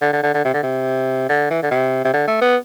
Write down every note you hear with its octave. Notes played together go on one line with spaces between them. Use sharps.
D3
D3
D3
D3
C3
D3
C3
D3
E3
D3
C3
C3
D3
A3
B3